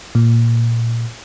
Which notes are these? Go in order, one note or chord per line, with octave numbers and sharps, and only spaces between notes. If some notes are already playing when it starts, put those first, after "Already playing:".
A#2